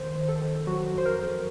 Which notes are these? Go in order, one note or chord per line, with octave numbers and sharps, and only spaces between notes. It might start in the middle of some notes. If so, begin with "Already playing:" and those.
Already playing: D#3 C5
D#3
A4
D#3
F#3 F#4
F2
C5
A#4
F2